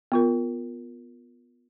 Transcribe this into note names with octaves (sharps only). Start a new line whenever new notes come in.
B3 F4 A#4